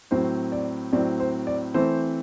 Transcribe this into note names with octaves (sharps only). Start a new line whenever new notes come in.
A2 F#3 C4 C5
D5
A2 F#3 C4 D5
C5
D5
E3 A3 C4 C5